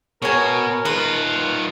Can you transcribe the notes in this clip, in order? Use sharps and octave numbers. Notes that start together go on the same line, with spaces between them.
B2 A#4 C#5 G#5
D#3 F4 B4